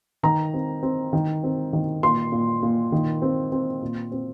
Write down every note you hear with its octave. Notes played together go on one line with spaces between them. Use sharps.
D#3 A#5
C4
C4
D#3
C4
D#3
A#2 C6
A#2
A#2
D#3
C4
C4
A#2
C4